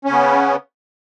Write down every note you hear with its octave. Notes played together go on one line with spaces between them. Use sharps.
C#3 B3 C#4